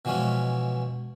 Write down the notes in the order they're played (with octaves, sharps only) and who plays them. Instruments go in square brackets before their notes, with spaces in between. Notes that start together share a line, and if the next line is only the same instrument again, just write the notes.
[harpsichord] B2 E3 F3 G#3 C#4